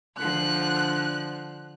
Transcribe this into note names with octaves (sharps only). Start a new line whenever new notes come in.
D3 F3 F#6